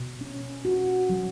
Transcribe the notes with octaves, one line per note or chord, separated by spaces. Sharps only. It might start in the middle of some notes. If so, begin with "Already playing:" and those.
Already playing: B2
C#4
F#4
F#3